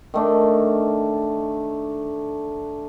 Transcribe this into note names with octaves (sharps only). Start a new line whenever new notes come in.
D#3 A3 D4